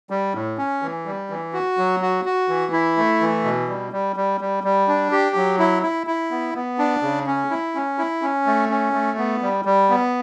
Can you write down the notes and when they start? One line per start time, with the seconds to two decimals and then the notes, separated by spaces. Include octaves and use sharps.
0.10 G3
0.35 A2
0.58 C#4
0.82 E3
1.06 G3
1.30 E3
1.53 F#4
1.77 F#3
2.02 F#4
2.25 F#4
2.48 E3
2.72 E4
2.97 A3
3.21 E3
3.44 B2
3.68 G3
3.92 G3
4.16 G3
4.41 G3
4.64 G3
4.88 D4
5.11 G4
5.36 F#3
5.59 E4
5.83 E4
6.07 E4
6.31 B3
6.55 B3
6.78 D4
7.02 C#3
7.26 C#4
7.50 E4
7.75 C#4
7.98 E4
8.22 C#4
8.47 A3
8.70 C#4
8.93 A3
9.18 B3
9.42 G3
9.65 G3
9.90 B3